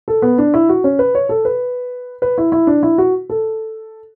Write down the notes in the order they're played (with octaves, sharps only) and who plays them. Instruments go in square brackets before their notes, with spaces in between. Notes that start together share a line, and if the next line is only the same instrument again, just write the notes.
[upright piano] A4
B3
D4
E4
F#4
C#4
B4
C#5
A4
B4
B4
E4
E4
D4
E4
F#4
A4